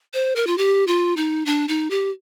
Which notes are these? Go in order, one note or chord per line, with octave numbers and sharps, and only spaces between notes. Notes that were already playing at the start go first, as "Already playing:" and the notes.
C5
A#4
F4
G4
F4
D#4
D4
D#4
G4